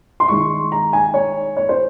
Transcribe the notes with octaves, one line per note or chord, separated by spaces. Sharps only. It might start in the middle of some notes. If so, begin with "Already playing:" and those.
C6
D#3 G#3 C#6
A#5
G#5
C#5
C#5
C5